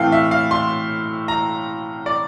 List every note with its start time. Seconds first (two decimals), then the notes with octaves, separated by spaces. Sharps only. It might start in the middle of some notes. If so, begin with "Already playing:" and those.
Already playing: A2 E3 A3 C4 F5 G5
0.12 E5
0.31 F5
0.51 C6
1.28 A#5
2.06 D5